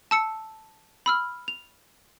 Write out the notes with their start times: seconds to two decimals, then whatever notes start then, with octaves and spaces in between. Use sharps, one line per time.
0.11 A5 E6 C#7
1.06 B5 E6 F6
1.48 F7